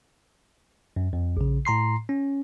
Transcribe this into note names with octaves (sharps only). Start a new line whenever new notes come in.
F#2
F2
A#1 C#3
A2 A#5 C6 C7
C#4